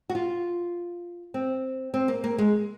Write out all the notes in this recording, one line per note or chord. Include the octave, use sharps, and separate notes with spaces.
F#4
F4
C4
C4
A#3
A#3
G#3